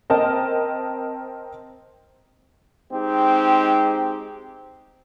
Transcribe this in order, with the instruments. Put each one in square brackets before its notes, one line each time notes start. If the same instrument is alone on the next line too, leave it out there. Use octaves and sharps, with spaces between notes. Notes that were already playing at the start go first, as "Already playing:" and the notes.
[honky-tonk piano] C4 A#4 D#5 A5
[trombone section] G#3 C4 D#4 G4